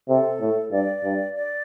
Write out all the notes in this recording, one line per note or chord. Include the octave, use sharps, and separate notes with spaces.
C3 A4
A2
G2 D5
G2
D5